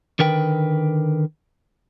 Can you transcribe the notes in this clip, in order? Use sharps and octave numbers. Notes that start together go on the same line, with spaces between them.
D3 D#3 A#4 B4 G5